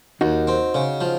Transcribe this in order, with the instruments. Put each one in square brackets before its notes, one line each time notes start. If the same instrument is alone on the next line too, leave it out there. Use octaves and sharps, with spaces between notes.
[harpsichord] D#2 [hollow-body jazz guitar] D#4 F#4
[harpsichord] C4
C#3
F3